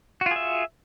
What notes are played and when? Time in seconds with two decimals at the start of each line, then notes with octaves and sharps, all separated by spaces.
0.21 F#4
0.26 F4
0.31 G#4
0.36 E5